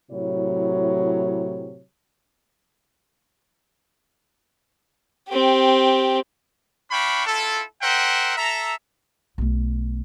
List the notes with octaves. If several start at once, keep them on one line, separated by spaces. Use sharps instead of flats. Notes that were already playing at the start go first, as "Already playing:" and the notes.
A2 C3 F#3 E4 C#5
C4 G4
D4 F5 G5 B5 C#6
E4 F4 A4
A#4 C5 E5 F#5 G5
A4 E5 A#5
B1 A3